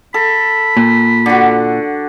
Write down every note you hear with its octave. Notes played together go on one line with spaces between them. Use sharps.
A4 B5
A#2
D3 F#4